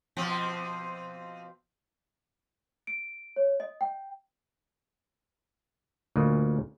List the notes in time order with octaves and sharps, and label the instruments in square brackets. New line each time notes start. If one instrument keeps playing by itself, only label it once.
[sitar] B2 F3 C4
[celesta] D7
C#5
D#5
G5
[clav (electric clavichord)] D2 A#2 D#5